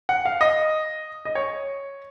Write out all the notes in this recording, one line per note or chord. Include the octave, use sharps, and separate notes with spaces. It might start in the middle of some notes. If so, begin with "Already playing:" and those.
F#5
F5
D#5
D#5
C#5